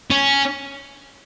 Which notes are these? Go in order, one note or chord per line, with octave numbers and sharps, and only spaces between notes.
C#4